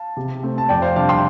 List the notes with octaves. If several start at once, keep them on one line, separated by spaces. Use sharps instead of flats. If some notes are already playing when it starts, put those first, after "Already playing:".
Already playing: F5 A5
C3
A3 C4
A5
F2 D5 G5
C5 F5
C3 G3 D4 F5 A5
G5 C6